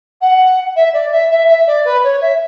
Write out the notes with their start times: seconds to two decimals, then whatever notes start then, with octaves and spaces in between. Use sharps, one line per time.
0.21 F#5
0.76 E5
0.93 D5
1.11 E5
1.30 E5
1.48 E5
1.67 D5
1.85 B4
2.03 C#5
2.21 E5